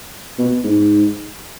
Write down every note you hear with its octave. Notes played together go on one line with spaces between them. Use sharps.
B2
G#2